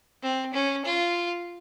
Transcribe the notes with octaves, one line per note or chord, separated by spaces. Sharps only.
C4
C#4
F4